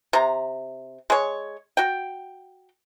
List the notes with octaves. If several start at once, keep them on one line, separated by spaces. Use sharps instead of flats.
C3 A#5
G#3 C#5
F#4 G5